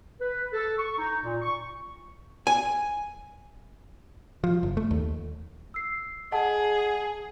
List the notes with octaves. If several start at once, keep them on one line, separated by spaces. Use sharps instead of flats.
B4
A4
C#6
D#4
A#2
C#6
G#5
F3
F#1
A3
D#2
E6 C7
G#4 D#5 F#5 A5